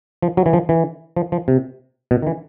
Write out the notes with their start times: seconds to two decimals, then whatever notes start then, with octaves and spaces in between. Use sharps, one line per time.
0.22 F3
0.37 F#3
0.46 E3
0.53 F3
0.69 E3
1.17 F3
1.32 F3
1.48 C3
2.11 B2
2.22 D#3
2.27 E3